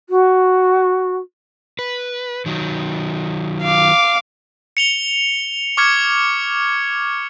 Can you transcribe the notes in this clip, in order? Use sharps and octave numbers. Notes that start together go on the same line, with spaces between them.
F#4
B4
D#3 F#3
F5 D6
C#7 F7 G7
C#6 D6 F6 G#6 C#7